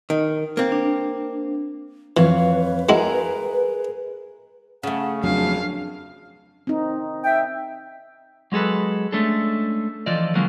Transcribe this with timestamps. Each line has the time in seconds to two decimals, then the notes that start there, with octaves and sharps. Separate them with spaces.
0.10 D#3
0.57 A#3 C4
0.72 D4
2.17 F2 E3 B4 C#5 F5
2.89 G#3 E4 F#4 G#4 A#4
4.83 C#3 A3 F#5
5.24 F#1 F2 F#3 D4 F5
6.67 C4 D#4
7.24 E5 G5
8.52 F#3 G#3 G#4 A4 B4
9.12 G#3 A3 C#4 D4 A4
10.06 E3 F3 F4 A4 D5 D#5
10.35 D3 F3 F#3 G#3 A#3 C#4